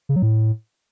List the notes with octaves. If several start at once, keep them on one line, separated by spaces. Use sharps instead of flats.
C#3
F#3
A2